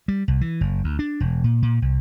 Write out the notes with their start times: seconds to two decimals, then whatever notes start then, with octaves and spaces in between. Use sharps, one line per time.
0.08 G3
0.28 C2
0.41 E3
0.61 F#1
0.84 D2
0.99 D4
1.20 E1
1.44 A#2
1.62 A#2
1.82 C2